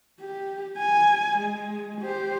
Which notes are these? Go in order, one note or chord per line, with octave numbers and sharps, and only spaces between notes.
G4
G#5
G#3
G4 C5